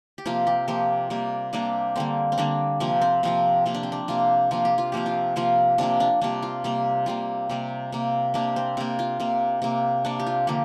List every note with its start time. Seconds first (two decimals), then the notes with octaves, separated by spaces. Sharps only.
0.18 G4
0.26 C3 F3 A#3 F4
0.47 G4
0.68 C3 F3 A#3 G4
1.10 C3 G3 A#3
1.53 C3 G3 A#3 D4
1.96 D3 G3 A#3 C4
2.32 C4
2.38 D3 G3 A#3 D4
2.80 C3 F3 A#3 C4
3.02 C4
3.23 C3 F3 A#3 C4
3.66 C3 A#3 F4
3.74 D4
3.83 C4
3.92 D4
4.08 C3 A#3 F4
4.51 C3 F3 A#3 F4
4.65 G4
4.78 F4
4.92 C3 F3 A#3 G4
5.06 F4
5.36 C3 F3 A#3 F4
5.78 C3 F3 A#3 D4
6.00 D4
6.22 C3 G3 A#3 D4
6.42 F4
6.64 C3 G3 A#3
7.06 C3 G3 A#3 F4
7.49 C3 G3 A#3
7.92 C3 A#3
8.34 C3 A#3 D4
8.56 C4
8.77 C3 A#3
8.99 F4
9.20 C3 A#3
9.62 C3 A#3
10.05 C3 A#3 D4
10.20 G4
10.27 F4
10.47 D3 F3 A#3 G4